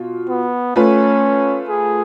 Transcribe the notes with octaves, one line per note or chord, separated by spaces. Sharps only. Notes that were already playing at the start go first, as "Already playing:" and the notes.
Already playing: B2 F4
B3
A3 C#4 F4 B4
G#4